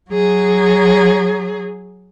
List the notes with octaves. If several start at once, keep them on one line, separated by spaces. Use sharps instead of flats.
F#3 G#4